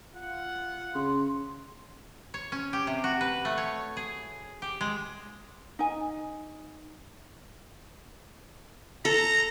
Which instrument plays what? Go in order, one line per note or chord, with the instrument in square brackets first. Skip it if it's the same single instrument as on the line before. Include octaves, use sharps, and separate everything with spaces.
[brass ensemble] F4 F#5
[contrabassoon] C#3 [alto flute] C6
[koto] C#5
C#4
G4
C3
F#4
B4
A3
C#5
G#4
G4
G#3
[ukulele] D#4 G#5
[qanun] A4 [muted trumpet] A#5